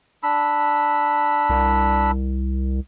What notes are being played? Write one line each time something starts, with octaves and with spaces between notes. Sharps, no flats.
D4 B5 E6
C2